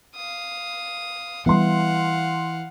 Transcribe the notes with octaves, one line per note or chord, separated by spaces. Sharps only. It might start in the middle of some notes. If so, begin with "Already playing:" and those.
F5 D#6
E3 G3 A3 B3 F5 F#5 C6